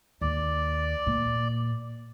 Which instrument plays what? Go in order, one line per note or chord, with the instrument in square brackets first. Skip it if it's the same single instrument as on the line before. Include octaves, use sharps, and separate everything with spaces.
[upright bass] D#2 [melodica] D5
[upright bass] A#2